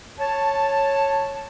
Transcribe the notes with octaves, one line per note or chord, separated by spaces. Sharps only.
C#5 A5